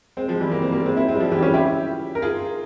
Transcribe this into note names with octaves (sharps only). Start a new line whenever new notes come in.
G#3 C4
F3 G#3
E3 G3
A#3
C4
G3 A#3
G#3 C4
C4 E4
G#3 C4
G3
F3
E3 G3
G4
C#4 F4
E4 G4
A#4
F4 G#4